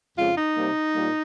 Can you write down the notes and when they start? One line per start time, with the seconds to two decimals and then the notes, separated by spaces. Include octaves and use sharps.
0.16 F2 C#3 G#3 F4
0.36 D#4
0.56 C3 G3 A#3
0.94 A#2 G3 A#3